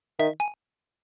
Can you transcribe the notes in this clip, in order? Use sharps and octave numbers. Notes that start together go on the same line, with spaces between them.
D#3 E5
G#5